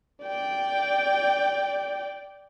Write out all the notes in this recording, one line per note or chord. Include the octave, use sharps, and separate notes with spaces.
D5 G5